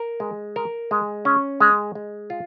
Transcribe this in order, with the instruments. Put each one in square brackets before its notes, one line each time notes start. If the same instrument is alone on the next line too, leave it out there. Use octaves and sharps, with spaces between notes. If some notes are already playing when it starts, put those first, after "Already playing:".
Already playing: [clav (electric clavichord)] A#4
G#3
A#4
G#3
C#4
G#3
G#3
F4